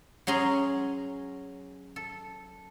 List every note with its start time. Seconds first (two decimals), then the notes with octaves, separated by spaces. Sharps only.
0.27 F#3 C#4 G#4 A#5 C6
1.96 A4